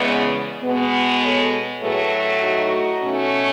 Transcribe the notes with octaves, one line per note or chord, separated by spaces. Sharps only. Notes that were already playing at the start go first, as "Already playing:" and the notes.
Already playing: E2 C#3 G#3 B3
B2 G#3 B3
A4 C#5
A2 F#3 A3 G#4 B4
D#4 F#4
B2 A3 C#4